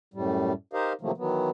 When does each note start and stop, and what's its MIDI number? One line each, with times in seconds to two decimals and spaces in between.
0.14 0.53 42
0.14 0.53 45
0.14 0.53 55
0.73 0.93 63
0.73 0.93 67
0.73 0.93 70
0.73 0.93 72
0.73 0.93 75
0.73 0.93 77
1.01 1.11 48
1.01 1.11 51
1.01 1.11 53
1.01 1.11 54
1.01 1.11 57
1.01 1.11 58
1.17 1.50 51
1.17 1.50 52
1.17 1.50 54
1.17 1.50 59